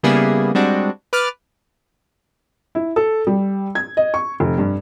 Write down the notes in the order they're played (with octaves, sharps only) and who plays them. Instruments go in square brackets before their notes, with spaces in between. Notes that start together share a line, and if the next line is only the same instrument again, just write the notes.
[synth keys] C#3 G3 A#3 B3 E4 G#4
G3 G#3 C4 D4 F#4
B4 D6 F6 A6
[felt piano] E4
A4
G3
G#6
D#5
C#6
F1
G2